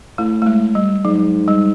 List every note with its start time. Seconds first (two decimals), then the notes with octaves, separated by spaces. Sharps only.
0.18 A2 A3
0.42 A3
0.46 G#3
0.75 G3
1.04 G#2 F#3
1.48 G3